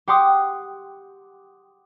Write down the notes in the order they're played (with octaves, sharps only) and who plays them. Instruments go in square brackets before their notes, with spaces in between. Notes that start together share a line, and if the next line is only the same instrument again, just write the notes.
[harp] G4 F#5 G5 C6 D6 D#6